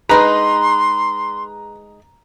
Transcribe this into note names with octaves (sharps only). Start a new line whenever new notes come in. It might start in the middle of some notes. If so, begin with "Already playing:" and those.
G#3 D#4 G#4 B4 A#5 C6